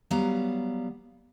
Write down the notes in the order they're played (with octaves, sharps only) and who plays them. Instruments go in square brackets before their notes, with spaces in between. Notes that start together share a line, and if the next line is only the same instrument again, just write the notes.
[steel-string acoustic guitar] F#3 G3 B3 F5 A#5